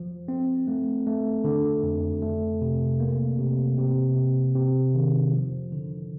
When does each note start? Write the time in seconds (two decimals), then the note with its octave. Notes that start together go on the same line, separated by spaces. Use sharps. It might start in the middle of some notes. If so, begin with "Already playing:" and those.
Already playing: F3
0.28 C4
0.68 A3
1.06 A3
1.44 D3
1.83 F2
2.22 A3
2.61 C3
3.00 A#3
3.39 C3
3.78 C3
4.16 C3
4.55 C3
4.94 D#3
5.33 F3
5.72 D3